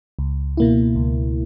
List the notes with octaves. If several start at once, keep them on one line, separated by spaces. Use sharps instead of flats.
C#2
B2 A#3 E4
C#2